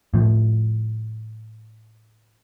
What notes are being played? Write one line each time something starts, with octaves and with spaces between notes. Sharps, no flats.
A2 F3